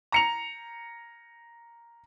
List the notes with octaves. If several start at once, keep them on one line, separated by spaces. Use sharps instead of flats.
A#5 C#7 F7